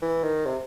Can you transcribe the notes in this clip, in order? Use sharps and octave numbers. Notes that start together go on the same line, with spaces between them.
E3
D#3
C3